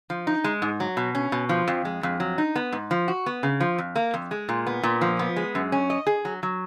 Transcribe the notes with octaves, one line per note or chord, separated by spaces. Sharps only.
F3
D#4
G#3
G#2
F#3
B2
C#4
B2
F3
F2
G#3
F2
F#3
D#4
B3
G#2
F3
F#4
B3
C#3
F3
F2
A#3
F2
G#3
A#2
B3
A#2
F3
B3
G#3
F#2
C#4
D#5
G#4
F#3
F#3